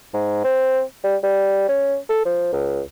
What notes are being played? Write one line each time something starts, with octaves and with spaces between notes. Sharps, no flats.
G#2
C4
G3
G3
C#4
A4
F3
C#2